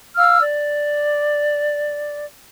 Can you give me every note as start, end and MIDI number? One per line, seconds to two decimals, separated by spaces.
0.17 0.40 77
0.17 0.40 88
0.17 0.40 89
0.41 2.24 74